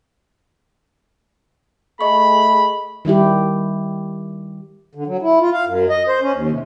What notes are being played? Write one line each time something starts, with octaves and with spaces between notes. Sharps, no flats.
A3 G#4 D#5 B5 C#6
D#3 G3 E4 G4
D3
F#3
E4
F4
F5
F#2
D#5
C5
C#4
D#2
C3